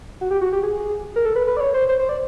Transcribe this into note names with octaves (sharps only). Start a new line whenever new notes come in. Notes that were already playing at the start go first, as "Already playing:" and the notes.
F#4
G4
F#4
G4
G#4
A#4
A4
B4
B4
D5
C#5
C5
C5
C5
D5